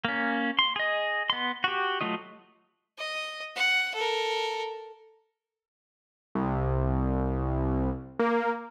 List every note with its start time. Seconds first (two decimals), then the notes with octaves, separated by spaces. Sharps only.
0.05 A#3 C#4
0.59 C6
0.76 G#4 D#5
1.30 B3 C6
1.64 F#4 G4
2.01 F#3 A3 F4 D#5
2.98 D#5
3.56 F#5
3.95 A4 A#4
6.35 C2
8.19 A#3